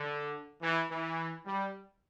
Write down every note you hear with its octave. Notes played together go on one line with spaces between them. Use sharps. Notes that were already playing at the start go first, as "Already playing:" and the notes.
Already playing: D3
E3
E3
G3